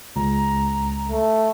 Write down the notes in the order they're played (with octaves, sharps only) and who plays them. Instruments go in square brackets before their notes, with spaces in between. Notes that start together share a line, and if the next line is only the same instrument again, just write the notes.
[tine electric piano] C#2 [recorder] A#5
[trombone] A3